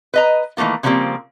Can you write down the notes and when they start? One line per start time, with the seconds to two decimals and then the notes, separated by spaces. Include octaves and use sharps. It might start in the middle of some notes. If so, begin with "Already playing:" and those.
0.14 B4 D#5 A#5
0.57 D#3 E3 A3 A#3 F4
0.83 C#3 E3 F3 G3 A#3 C4